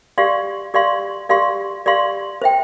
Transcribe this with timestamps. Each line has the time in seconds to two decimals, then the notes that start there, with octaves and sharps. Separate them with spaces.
0.18 G4 D5 F5 C6
0.74 G4 D5 F5 C6
1.29 G4 D5 F5 C6
1.86 G4 D5 F5 C6
2.42 C5 E5 G5